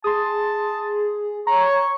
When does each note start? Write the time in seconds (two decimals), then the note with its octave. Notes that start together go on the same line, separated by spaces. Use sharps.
0.04 G#4 A5 C6 D#6
1.47 C#5 A#5 C#6